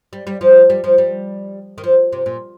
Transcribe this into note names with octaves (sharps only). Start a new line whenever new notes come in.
G3
G3
F3
G3
F3
G3
D#3
F3
C3
A#2